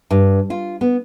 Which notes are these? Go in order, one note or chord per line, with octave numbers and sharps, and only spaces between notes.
G2
F4
B3